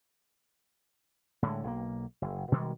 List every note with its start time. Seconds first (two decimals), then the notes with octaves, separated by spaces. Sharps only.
1.42 A2 D3 G#3
1.64 B1 E3 A#3
2.22 F#1
2.52 B2 D#3 G3 G#3